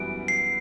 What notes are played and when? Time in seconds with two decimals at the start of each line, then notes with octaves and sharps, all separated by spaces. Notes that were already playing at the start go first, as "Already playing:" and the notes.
Already playing: F#2 E3 G3 B3 F#4 D7
0.28 C7